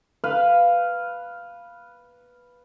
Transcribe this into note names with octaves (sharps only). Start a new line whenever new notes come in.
B4 F5